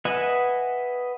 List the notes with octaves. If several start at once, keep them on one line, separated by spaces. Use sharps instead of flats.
B4 D#5 E5 F#5 G#5